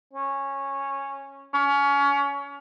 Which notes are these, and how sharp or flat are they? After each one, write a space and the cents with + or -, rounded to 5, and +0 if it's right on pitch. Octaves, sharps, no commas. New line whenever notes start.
C#4 -10
C#4 +25